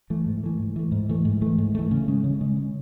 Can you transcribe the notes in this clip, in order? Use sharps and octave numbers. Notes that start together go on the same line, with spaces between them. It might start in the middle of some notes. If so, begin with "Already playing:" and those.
E3 A3
G#2
E3 A3
G#2
E3 A3
G#2
E3 A3
G#2
E3 A3
G#2
E3 A3
C#3
G#3 C#4
C#3
G#3 C#4
C#3